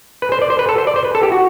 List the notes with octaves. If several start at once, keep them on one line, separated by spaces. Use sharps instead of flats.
B4
C5
D5
C5
B4
A4
C5
D5
C5
B4
A4
G4
F#4